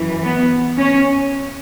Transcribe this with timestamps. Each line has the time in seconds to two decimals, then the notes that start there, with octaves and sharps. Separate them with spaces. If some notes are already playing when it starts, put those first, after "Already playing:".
Already playing: F#2 E3
0.23 B3
0.78 C#4